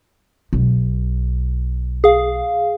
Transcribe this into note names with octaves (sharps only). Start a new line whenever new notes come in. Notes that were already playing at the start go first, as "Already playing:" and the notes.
B1
G#4 F5